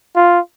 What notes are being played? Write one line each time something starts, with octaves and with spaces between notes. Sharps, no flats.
F4